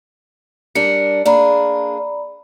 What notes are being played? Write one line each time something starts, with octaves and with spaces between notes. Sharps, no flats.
G3 D4 A#4 C#7
A#3 D4 G#4 D5 A#5 B5